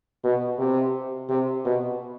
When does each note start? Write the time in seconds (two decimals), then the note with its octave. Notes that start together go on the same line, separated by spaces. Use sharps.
0.24 B2
0.59 C3
1.29 C3
1.65 B2